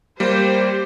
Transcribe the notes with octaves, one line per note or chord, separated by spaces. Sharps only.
G3 A#3 G4 C5